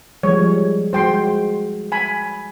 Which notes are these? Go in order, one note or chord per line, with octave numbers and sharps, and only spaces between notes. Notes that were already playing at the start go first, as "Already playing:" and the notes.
F3 G3 G#3 C#5
G#3 F#4 C5 G5 C6
G#5 B5